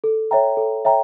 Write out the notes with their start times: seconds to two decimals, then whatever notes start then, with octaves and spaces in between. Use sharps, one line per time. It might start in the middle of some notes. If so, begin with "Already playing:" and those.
0.04 A4
0.31 C#5 E5 G5 A#5
0.57 A4
0.85 C#5 E5 G5 A#5